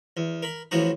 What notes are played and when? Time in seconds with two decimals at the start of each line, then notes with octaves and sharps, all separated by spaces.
0.17 E2
0.43 A#4 B5
0.71 A1 A2 E3 F3 F#4 A#5